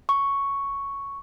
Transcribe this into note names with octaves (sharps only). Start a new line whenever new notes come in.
C#6